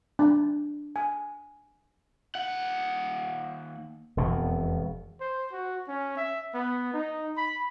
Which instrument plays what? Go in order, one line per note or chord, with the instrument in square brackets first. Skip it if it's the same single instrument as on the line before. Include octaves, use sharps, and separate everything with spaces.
[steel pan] D4
G#5
[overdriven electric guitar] D#2 F#5
[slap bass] E1 F2 B2
[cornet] C5
F#4
C#4
E5
B3
D#4
B5